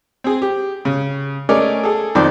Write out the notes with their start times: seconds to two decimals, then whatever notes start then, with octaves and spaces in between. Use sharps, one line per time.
0.24 C4 G#4
0.42 G4
0.85 C#3
1.49 A3 C#4 G#4 A#4 D5 D#5
1.84 G#4 A4
2.15 F2 D#3 F3 C5 D5